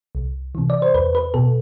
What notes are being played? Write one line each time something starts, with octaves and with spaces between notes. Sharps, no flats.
C2
C3 E3
D5
C5
E2 B4
B4
B2 A4